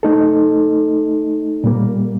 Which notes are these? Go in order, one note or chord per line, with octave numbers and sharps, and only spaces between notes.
A3 D#4 A4
A#2 G3 A#3